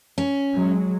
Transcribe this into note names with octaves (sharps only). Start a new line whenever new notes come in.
C#4
F#3 G#3